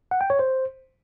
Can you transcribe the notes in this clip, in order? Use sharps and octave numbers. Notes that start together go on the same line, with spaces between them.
F#5
G5
C#5
C5